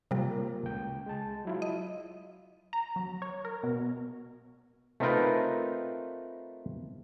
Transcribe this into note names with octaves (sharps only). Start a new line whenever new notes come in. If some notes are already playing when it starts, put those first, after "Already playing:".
C3 G3 A#3 F4
C#2 G5
G#3 A5
F#3 E4 F4
D#5
A#5
F#3
C#5
A#4
B2
A3 C4 D#4 F4 A#4 B4